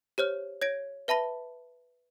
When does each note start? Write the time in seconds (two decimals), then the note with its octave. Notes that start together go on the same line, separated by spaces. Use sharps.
0.18 G4 C5 C#5 F6
0.62 C#5 G#6 A#6 D7
1.08 B4 E5 A5 B5 A#6